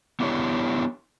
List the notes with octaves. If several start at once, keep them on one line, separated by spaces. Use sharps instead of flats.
B3 D4 E4 G4 A4 C#5